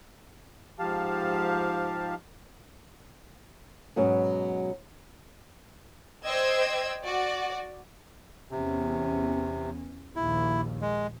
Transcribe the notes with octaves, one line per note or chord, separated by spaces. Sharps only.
G#2 F3 G4 F5 A5
G#2 B2 F#3 B3 C#4
C5 D5 D#5 G5 E6 G#6
F#4 D5
E2 C3 C#4
A#1 D#2 E4
G#3